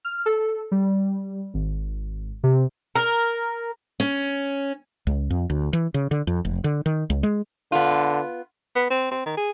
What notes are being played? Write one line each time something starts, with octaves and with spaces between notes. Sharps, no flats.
F6
A4
G3
G#1
C3
A#4
C#4
C#2
F2
D2
E3
C#3
D3
F2
F1
D3
D#3
C#2
G#3
D3 B3 F4
B3
C4
C4
D#3
G#4